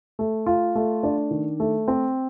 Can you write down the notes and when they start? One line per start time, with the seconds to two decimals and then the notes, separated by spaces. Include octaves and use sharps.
0.19 A3
0.46 F4
0.75 A3
1.03 D4
1.31 D#3
1.60 A3
1.88 C4